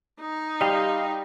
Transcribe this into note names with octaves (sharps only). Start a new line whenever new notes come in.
D#4
G3 D#5 F5 C6